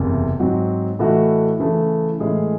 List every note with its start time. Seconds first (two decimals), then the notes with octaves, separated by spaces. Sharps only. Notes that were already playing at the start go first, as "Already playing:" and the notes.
Already playing: F#1 E2 C3
0.39 G#2 F#3 C4 F#4
0.99 A2 E3 A3 D#4 F#4
1.59 C#3 E3 A3
2.20 A2 E3 G#3 C#4 G#4